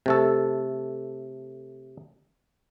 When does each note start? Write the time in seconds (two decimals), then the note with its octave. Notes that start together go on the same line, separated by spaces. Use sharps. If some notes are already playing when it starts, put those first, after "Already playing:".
0.06 C3 A3 A4